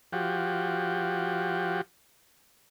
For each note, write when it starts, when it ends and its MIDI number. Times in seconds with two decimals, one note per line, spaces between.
0.12 1.81 53
0.12 1.81 66
0.12 1.81 67